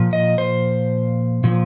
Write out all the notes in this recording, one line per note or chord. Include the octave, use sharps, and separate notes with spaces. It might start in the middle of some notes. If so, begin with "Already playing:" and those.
Already playing: A#2 F3
D#5
C5
A#2 F3